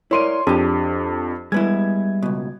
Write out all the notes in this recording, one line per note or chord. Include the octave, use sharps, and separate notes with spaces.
E4 A#4 C#5 D5 C6 D#7
F2 D4 G4 G#4
G3 G#3 B3 E4 G#6
C#2 B2